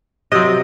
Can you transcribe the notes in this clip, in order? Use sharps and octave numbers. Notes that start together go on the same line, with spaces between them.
C3 F#3 C4 D#5